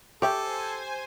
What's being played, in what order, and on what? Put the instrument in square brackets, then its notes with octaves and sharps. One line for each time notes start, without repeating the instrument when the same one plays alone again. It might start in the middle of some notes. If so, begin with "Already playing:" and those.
[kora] G4 [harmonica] A4 [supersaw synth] C5 G#5 [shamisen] C#5 E5 G5